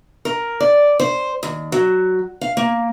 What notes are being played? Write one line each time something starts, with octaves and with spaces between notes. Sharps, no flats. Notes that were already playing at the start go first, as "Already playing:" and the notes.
A#4
D5
C5
D#2
F#3
F5
A#3